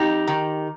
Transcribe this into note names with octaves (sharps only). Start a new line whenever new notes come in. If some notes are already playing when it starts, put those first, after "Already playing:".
Already playing: F2 D#4 G4
D#3